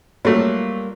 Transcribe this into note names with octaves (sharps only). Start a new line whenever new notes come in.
F#3 G3 A3 A#3 F4